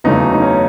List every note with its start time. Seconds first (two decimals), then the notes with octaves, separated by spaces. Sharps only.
0.04 F#1 E2 C#3 F#3 A3 D#4
0.34 D#4
0.42 C#4